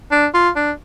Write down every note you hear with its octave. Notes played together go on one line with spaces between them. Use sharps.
D4
F4
D4